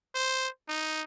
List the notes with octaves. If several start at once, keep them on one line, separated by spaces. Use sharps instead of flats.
C5
D#4